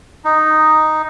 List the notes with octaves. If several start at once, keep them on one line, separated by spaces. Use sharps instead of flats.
D#4